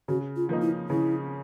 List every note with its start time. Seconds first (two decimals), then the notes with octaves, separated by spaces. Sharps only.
0.08 C#3 F#4
0.36 F4
0.49 F3 A#3 D#4
0.62 E4
0.89 C#3 E4